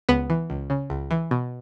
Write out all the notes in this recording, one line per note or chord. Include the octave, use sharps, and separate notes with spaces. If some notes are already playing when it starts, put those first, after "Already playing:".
C#2 B3 B4
E3
C#2
C#3
C#2
E3
B2